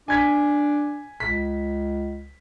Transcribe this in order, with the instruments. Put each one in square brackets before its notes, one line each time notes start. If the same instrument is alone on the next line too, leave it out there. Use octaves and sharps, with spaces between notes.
[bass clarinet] D4 [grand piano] G#5 G#6 B6
[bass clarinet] C#2 [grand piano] B6